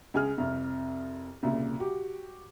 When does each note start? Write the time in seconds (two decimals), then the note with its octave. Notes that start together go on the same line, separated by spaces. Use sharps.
0.14 C#2 G#4 F6
0.38 C2 F2
1.43 C2 A#2 C#3
1.79 F#4 G4